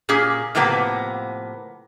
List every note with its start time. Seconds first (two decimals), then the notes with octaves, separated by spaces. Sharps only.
0.09 A#2 C#4 G4 G#4
0.55 A2 C3 F3 A#3 B3